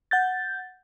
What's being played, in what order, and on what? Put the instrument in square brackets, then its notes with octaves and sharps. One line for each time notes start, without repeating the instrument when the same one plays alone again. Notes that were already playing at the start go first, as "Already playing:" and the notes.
[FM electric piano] F#5 G6 A6